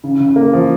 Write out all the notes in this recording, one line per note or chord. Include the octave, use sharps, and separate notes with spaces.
C#3
C#3
A#3
F3